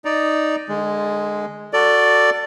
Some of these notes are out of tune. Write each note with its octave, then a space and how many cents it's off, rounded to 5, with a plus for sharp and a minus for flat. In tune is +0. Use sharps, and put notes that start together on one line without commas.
D#4 +0 D5 +0 A#5 +0
D3 +30 G#3 +0
F#4 -10 A4 +25 D5 +0